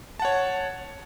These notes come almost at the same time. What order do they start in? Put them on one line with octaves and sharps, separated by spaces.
A5 F#5 C#5